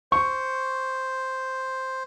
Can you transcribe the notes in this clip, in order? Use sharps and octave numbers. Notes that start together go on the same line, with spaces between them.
C5 C#6